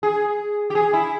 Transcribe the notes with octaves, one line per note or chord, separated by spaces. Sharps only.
G#4
G4
G#4
E4